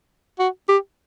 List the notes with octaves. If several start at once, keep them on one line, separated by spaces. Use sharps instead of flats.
F#4
G4